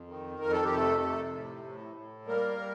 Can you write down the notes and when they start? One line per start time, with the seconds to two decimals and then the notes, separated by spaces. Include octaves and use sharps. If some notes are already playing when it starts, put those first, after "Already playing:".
Already playing: F2
0.08 D#3
0.39 F2 A#4
0.52 A4
0.64 G4
0.71 C3 A3 A4
1.03 C3
1.33 A2
1.65 A2
1.96 A2
2.26 G3 A#3 A#4
2.58 G3